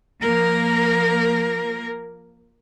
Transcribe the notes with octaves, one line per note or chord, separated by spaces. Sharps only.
F3 A#3 A#4